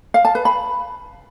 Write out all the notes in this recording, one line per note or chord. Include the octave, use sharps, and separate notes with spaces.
F5
A5
B4
B5